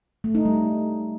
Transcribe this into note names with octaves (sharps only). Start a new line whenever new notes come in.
A3
D#4
G3